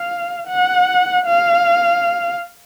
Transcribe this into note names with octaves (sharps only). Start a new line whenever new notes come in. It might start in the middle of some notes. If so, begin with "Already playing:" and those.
Already playing: F5
F#5
F5